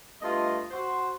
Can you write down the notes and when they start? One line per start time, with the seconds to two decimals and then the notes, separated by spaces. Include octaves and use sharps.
0.20 G2 A3 F4 D#5
0.71 F#4 C5